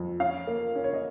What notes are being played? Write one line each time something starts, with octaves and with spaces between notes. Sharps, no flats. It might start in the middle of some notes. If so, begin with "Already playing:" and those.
Already playing: F2
C#4 F5
A#3
C#4
C#5
D#5